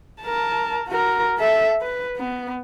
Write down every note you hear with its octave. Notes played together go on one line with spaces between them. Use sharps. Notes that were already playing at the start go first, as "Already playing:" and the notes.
A#4 A5
F#4 A#4
A4 E5
B4
B3